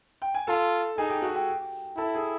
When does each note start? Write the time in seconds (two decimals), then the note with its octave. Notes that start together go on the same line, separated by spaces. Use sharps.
0.22 G5
0.34 G#5
0.47 F4 A4 A5
0.97 D#4 G#4 G#5
1.10 G4 G5
1.22 F#4 F#5
1.35 G4 G5
1.97 E4 A4 A5
2.14 G#4 G#5